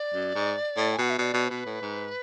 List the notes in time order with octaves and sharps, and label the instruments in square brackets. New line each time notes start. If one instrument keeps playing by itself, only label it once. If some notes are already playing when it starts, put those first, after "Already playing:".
Already playing: [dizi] D5
[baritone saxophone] F#2
G#2
A2
[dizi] G#5
[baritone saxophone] B2 [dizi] F#5
[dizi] E5
[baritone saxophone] B2 [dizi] D5
[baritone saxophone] B2
[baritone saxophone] B2 [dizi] B4
[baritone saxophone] A2
G#2